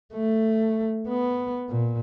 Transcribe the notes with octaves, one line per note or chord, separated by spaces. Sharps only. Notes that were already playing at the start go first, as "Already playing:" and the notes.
A3
B3
A#2